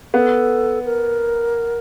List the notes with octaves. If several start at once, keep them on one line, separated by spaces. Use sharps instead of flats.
B3 A4
A#4